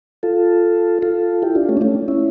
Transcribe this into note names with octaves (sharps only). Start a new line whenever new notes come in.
F4 A4
F4 A4
E4 G4
D4 F4
A3 C#4
D4
A3 C#4
C#4 E4